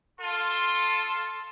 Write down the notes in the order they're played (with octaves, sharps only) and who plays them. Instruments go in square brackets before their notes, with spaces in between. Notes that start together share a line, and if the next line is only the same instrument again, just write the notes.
[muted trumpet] F4 [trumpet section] A4 A5 C6